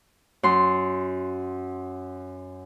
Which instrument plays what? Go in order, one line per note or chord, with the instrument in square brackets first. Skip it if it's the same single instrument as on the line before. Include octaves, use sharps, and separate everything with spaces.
[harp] F#2 C6